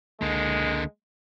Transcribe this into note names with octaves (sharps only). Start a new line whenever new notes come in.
C#2 D3 G#3 A#3